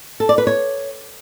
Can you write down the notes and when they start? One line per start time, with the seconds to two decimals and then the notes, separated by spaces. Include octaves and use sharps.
0.20 A4
0.29 D5
0.38 B4
0.47 C#5